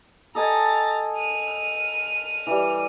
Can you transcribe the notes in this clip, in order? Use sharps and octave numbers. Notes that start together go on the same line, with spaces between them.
A4 D#5 G#5 A#5 A6
F6 D#7
E3 G3